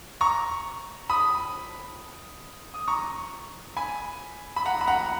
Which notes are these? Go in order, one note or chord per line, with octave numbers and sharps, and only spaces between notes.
A#5 C#6
B5 D#6
D#6
A#5 C#6
G#5 B5
B5
F#5 A#5
B5
F#5 A#5